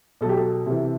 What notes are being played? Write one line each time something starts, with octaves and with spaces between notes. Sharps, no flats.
B2 F#3 G4 A4
A4
C3 E3